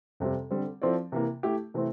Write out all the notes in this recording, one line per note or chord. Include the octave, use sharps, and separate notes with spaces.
F2 C3 G3 C4 G4
D3 G3 C4
F3 C4 E4 A4 D5
C3 E3 A#3
A3 E4 G4
C3 E3 A3 C4